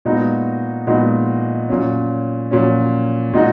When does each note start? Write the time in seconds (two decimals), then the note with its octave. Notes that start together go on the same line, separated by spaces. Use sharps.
0.05 A#2 G#3 B3 D#4 F#4
0.87 A#2 G#3 B3 D#4 F#4
1.69 A#2 F#3 C#4
2.51 A#2 F#3 C#4
3.33 A#2 G#3 D#4 F#4